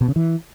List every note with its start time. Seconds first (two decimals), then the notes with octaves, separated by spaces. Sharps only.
0.01 B2
0.08 C#3
0.16 E3